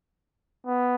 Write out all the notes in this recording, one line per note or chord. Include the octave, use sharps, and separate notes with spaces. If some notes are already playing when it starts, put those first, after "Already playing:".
B3